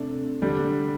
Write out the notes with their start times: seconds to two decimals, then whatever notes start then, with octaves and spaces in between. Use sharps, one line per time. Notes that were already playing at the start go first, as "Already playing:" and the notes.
Already playing: C3 A3 D4
0.42 D3 G3 D4